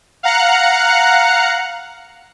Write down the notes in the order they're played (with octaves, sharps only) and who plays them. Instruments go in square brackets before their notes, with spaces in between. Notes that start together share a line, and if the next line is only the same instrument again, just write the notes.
[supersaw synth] F5 F#5 A#5 F#6 C#7